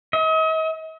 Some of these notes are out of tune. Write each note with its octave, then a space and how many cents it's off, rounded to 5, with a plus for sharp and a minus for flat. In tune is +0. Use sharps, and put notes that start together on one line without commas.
D#5 +40